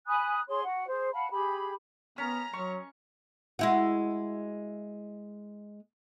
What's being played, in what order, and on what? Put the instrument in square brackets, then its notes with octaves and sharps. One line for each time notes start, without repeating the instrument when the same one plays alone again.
[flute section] G#5 B5 D#6 F#6
G#4 C#5 C6
F#4 F#5
G#4 C5
F5 F#5 A5 B5
G4 G#4 B5
[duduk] B3 [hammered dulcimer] C#4 [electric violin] A#5 F6
[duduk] F#3 [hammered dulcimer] C#6
[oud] G#3 E4 F#4